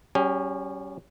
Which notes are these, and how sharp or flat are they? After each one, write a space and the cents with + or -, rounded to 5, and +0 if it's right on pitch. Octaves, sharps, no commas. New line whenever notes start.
G3 -40 C#4 +0 G4 +45